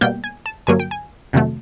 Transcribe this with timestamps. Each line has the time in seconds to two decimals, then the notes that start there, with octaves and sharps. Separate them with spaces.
0.01 B2 G3 A#3 G5
0.24 G#5
0.46 A5
0.67 G2 D3 F#3 A#3 G#5
0.80 G5
0.91 G#5
1.33 F2 C3 D#3 F#3 A3